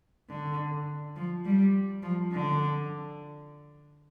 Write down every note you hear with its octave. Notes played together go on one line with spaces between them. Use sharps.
D3
F3
G3
F3
D3